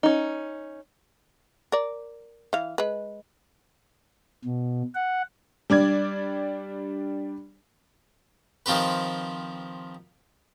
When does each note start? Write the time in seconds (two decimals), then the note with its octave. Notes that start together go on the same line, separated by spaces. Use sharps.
0.03 C#4 D#4
1.72 A#4 D5
2.53 E3 F5
2.78 G#3 B4
4.45 B2
4.95 F#5
5.70 G3 D4 D5 G#6
8.66 D#3 F3 C4 G4 B4